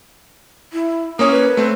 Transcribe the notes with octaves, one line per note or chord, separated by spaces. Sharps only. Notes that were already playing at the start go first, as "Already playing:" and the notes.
E4
A#3 C#4 C#5 D#6
B4
A3 C4